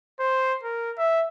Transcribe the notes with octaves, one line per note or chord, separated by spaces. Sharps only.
C5
A#4
E5